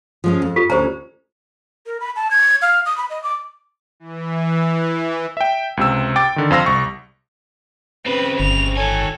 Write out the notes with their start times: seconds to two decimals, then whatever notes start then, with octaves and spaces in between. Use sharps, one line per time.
0.24 F3 G#3 C#4
0.42 F2
0.56 F4 G4 A4
0.70 D2 C#4 G4 C5 A#5
1.86 A#4
2.00 B5
2.16 A5
2.31 G#6
2.62 F5
2.86 D#6
2.98 B5
3.10 D#5
3.23 D6
4.00 E3
5.37 E5 G5
5.77 C#2 C3 E6
6.16 G5 D6 A6
6.36 D3 D#3
6.51 F2 C5 F5 C6 E6 A#6
6.66 C2 C#6
8.06 C#3 C4 B4
8.40 G1 F7
8.77 D#3 A4 C#5 G#5